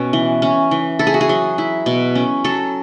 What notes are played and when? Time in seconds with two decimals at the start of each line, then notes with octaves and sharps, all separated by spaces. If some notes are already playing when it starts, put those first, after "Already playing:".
Already playing: B2 C#4
0.13 E3
0.42 C#4
0.71 E3
0.99 E4 A4
1.07 G#4
1.14 F#4
1.21 G#4
1.29 F#3
1.58 E4
1.86 B2
2.15 C#4
2.44 F#3 A4